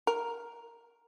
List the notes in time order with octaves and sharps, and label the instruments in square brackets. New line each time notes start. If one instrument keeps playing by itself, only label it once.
[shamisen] A#4